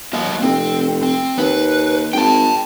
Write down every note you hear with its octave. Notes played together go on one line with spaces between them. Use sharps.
F#3 A#3 D#5
F1 C4
C4
D#2 B4
G#1 G5 A5